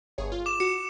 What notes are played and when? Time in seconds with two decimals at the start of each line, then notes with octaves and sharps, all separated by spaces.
0.18 G1 G#4 C#5
0.32 F4
0.46 D6 E7
0.60 F#4 C#7